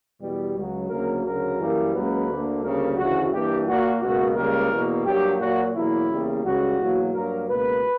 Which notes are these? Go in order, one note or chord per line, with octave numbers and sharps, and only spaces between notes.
E2 B2 G3
C#2 C#3 F#3
D2 C#3 F#3 A#3 A#4
D2 C#3 F#3 A#4
F#2 E3 G3 A#3
C#2 C#3 F#3 A#3 B4
D2 D3 A#3
D2 C#3 G3 A#3 A#4
D2 C#3 E3 F#4
G2 E3 A#3 G4
A#2 A#3 F#4
C#2 B2 A#3 F#4
C#2 C#3 G3 A#3 A#4
E2 B2 A#3
G2 F#3 A#3 G4
A#2 F#3 A#3 F#4
E2 B2 F#3 A#3 E4
E2 C#3 G3 A#3
C#2 C#3 G3 F#4
E2 B2 F#3 A#3
G2 F#3 A#3 A#4
C#2 B2 A#3 B4